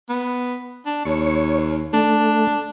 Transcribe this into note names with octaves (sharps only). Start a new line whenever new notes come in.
B3
D4
D#2 C#5
A3 D4